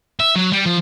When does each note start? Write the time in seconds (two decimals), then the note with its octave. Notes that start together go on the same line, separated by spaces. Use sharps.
0.20 E5
0.36 F#3
0.53 G3
0.66 F3